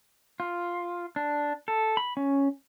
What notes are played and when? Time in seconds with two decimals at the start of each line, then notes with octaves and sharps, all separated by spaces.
0.40 F4
1.16 D4
1.68 A4
1.97 B5
2.17 C#4